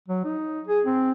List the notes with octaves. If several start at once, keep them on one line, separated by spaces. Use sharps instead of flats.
F#3
D#4
G#4
C4